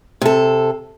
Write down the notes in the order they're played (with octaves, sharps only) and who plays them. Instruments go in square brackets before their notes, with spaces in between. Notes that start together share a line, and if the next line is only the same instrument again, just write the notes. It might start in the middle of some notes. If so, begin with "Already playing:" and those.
[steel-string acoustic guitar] C3 A4